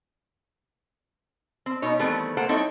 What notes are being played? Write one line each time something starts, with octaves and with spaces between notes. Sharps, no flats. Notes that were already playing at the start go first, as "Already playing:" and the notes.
C4
B2 D#4 C#5
D#3 E3 G3 A3 B3 C4
A#3 A4 C5 F#5
G3 C4 D#4 E4 A4 C#5